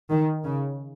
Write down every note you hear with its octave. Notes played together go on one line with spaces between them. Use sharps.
D#3
C#3